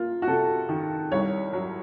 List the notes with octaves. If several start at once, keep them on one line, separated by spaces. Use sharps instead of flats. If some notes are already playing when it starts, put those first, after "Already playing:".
Already playing: A#3 F4
F#4
C3 A4
D#3
C2 C#5
F#3